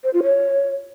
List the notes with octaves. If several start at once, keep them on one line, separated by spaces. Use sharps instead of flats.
C5
F4
C#5